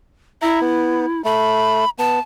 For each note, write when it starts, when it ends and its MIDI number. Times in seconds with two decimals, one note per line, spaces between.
0.42 1.22 64
0.42 0.59 76
0.42 0.59 82
0.61 1.06 59
1.24 1.85 57
1.24 1.89 83
1.99 2.19 59
1.99 2.20 81